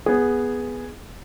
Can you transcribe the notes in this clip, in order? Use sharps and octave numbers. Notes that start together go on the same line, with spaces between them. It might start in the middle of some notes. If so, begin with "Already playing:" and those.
B3 G#4